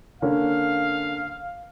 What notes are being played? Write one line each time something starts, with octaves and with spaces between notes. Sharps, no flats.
D3 A#3 C#4 F5